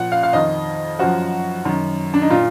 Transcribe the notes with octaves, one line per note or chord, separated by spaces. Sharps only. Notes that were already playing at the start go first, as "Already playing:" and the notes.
Already playing: A#2 F3 F#5
F5
F5
F2 D#3 D#5
F#2 F3 F#4
F#2 D#3
D4
D#4
A#2 F4